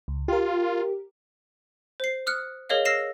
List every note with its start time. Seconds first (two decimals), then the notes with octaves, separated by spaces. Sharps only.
0.08 C#2
0.28 F4 G4 A#4
2.00 C5 C7
2.27 D#6 F6 F#6 C#7
2.70 G#4 A#4 C#5 D#5 F5
2.85 E6 F6 A#6 C7 E7